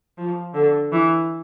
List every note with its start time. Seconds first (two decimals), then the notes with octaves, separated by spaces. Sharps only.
0.18 F3
0.54 D3
0.92 E3